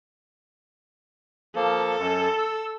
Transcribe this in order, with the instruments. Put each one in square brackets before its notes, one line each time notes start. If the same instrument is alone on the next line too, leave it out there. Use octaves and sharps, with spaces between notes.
[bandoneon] F3 A#3 [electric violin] A4
[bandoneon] F#2
E6